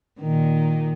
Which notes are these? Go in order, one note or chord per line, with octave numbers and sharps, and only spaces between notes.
A#2 D#3